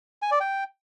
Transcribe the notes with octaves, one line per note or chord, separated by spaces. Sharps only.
G#5
D5
G5